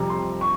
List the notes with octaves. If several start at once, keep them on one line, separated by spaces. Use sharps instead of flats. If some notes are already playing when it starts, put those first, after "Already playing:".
Already playing: F2 C3 G3 A#5
C6
C#6